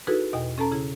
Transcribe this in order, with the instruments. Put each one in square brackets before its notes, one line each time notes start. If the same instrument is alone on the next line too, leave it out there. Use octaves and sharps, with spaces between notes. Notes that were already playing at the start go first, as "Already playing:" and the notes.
[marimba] D#4 E4 F#4 G#4 A4 B4
E2 B2 D#5 F#5 G5
C#4 A4 A5 A#5
C#3 E4 G#4